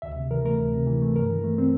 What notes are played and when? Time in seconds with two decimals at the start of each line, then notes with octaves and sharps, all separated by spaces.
0.02 D2 E5
0.16 C3
0.31 E3 A#4
0.45 A3 A#4
0.59 D2
0.73 C3
0.87 E3
1.02 A3
1.16 G2 A#4
1.30 E3
1.44 A3
1.58 C4